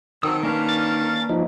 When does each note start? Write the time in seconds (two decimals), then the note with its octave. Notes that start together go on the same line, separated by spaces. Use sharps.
0.23 D#3 F#3 C4 A4 D#6 E6
0.43 A#3 C#4 D4 A#4 B4 F5
0.69 A6
1.29 F3 D#4